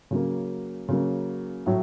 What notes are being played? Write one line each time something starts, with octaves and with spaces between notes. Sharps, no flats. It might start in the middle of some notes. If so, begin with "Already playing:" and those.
C#3 F#3 A#3
C#3 F#3 A#3
A2 F#3